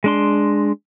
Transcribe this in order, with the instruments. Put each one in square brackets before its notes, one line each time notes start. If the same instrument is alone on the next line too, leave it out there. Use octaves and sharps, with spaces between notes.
[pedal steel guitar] G#3 D4 C6